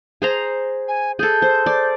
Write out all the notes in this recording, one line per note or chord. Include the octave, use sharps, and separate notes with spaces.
G#4 C5 A#5
G#5
G#4 A4 G6
C5
D5